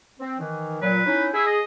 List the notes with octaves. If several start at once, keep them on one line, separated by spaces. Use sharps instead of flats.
C4
D#3 E3
A#2 F#3 B4
C#4 D#4 E4
E4 G#4
D#5